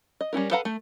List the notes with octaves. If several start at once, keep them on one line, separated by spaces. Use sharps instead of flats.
D#5
G3 C#4 E4 A#4
A4 B4 F5 F#5 A#5
A3